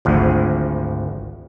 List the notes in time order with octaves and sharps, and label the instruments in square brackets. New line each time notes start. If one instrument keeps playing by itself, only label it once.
[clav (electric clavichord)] G#1 D2 F3